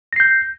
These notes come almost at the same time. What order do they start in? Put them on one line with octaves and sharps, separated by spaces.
A#6 C7 G6